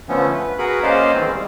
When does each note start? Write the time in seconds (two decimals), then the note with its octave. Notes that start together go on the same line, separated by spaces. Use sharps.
0.09 D3 F3 A3 B3 C#4
0.34 B4
0.58 F#4 G#4 A#4 B4 B5
0.83 A#3 C#4 C5 D5 D#5 F5
1.14 D#3 E3 G#3 C4
1.32 G3